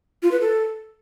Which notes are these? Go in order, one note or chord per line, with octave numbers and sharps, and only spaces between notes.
F4
B4
A4